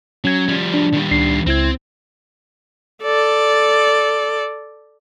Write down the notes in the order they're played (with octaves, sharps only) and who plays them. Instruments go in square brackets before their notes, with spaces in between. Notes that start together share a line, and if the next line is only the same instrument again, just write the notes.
[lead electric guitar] F#3 [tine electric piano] C#4 G#6
[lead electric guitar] F3 G3
[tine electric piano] D4
[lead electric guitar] D#3 G3
[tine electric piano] C#2 D4 C7
[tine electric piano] C#2 E4 G#6 [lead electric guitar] C4
[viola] A4 D5